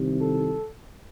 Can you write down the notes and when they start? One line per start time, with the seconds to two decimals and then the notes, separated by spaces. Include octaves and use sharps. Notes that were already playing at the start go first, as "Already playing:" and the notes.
Already playing: C2 C3 D#3
0.21 A4